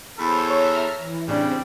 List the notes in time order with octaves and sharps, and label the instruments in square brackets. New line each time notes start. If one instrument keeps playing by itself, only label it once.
[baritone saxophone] E2 [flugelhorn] A4 [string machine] C5 C#5 [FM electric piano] B5
[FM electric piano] C#5 [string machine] E5 A#5 F6
[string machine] E3
[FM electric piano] A2 D4 [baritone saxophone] C#3 [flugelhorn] G3 [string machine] C4